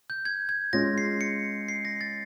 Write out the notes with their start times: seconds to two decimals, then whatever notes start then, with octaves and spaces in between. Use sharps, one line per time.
0.10 G6
0.25 G#6
0.49 G#6
0.73 G#3 C#4 F4 A#6
0.98 C7
1.21 C#7
1.68 C7
1.85 A#6
2.01 A6